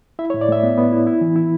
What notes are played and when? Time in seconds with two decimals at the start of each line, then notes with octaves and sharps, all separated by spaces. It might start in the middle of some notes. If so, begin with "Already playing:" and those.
0.19 E4 E5
0.30 C#5
0.34 A2
0.41 D5
0.48 A2 E5
0.63 B3
0.78 B3
0.92 E4
1.07 E4
1.21 E3
1.36 E4